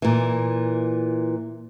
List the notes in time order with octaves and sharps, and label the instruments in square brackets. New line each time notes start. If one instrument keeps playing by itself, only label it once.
[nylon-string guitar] A#2 E3